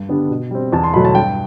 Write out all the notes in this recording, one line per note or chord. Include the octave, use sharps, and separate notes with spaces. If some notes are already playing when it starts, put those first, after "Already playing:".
Already playing: G2
D3 G3 B3 D4
B2
G3 C4
E2 A5
C6
B2 F#3 A3 B5
A5
G2 G5